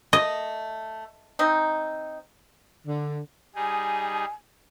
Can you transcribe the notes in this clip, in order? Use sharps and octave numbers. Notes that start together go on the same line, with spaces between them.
A3 D#5
C4 D#4
D3
G3 D#4 G#4 G#5